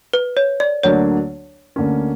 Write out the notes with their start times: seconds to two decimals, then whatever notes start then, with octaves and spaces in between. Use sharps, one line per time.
0.13 B4
0.37 C#5
0.60 D5
0.83 D2 D3 F#3 A#3 D4 C#5
1.76 D2 D3 A#3 C#4